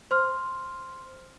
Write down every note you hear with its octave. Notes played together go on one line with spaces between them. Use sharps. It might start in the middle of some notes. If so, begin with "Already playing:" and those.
C5 C6 F6